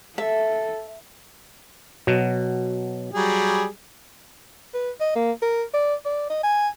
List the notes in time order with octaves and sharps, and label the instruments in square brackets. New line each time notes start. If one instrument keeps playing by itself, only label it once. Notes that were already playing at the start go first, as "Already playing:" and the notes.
[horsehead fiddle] A4 [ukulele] E5
[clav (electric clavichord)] B2 F#3
[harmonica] F#3 G3 G#4
[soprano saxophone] B4
D#5
A#3
A#4
D5
D5
D#5
G#5